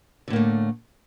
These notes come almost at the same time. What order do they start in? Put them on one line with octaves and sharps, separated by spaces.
D3 A2 A#3 A3